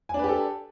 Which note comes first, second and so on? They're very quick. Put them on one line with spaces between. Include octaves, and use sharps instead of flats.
G#5 D4 B4 G4 A4